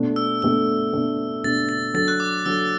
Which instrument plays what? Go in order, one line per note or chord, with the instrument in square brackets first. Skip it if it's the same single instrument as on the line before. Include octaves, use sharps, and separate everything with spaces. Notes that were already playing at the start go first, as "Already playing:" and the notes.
Already playing: [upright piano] B2 A3 D4
[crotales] E6
[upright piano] B2 A3 D4 [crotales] E6
[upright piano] B2 A3 D4
[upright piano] B2 A3 D4 [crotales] A6
[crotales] A6
[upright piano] F#3 D4 A4 [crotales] A6
[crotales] F#6
D6
[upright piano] F#3 D4 A4 [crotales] E6